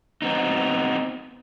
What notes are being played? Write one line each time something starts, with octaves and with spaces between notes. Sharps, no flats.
B3 C4 D#4